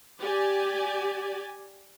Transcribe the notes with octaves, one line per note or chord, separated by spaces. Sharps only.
G4 D5 G#5